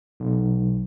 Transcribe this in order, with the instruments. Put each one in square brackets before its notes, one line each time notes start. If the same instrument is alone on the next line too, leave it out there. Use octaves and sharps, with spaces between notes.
[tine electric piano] B1